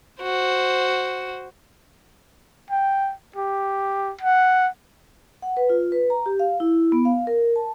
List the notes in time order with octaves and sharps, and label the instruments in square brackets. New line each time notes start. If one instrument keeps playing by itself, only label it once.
[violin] F#4 C5
[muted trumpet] G5
G4
F#5
[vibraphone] F#5
B4
F4
B4
A#5
G4
F5
E4
B3
F5
A#4
A5